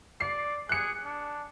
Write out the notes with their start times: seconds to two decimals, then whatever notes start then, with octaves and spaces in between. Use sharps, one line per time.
0.20 D5 C7
0.69 G#4 F#6 C#7
1.05 D4